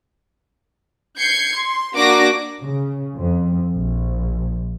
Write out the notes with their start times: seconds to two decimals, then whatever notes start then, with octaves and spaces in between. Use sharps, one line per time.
1.18 G6 G#6 C7 C#7
1.56 C6
1.93 A#3 D4 F#4 D6 A#6
2.63 C#3
3.17 F2
3.75 A#1